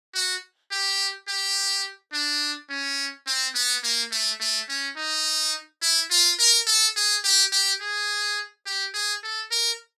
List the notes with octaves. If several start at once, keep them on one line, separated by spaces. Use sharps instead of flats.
F#4
G4
G4
D4
C#4
C4
B3
A#3
A3
A3
C#4
D#4
E4
F4
A#4
A4
G#4
G4
G4
G#4
G4
G#4
A4
A#4